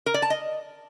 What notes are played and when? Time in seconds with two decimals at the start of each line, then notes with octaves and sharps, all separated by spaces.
0.06 A#4
0.14 D5
0.22 A5
0.30 D#5